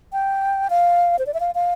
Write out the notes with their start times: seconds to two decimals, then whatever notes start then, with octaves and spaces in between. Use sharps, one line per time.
0.13 G5
0.70 F5
1.19 C5
1.26 D5
1.34 E5
1.40 F5
1.55 F5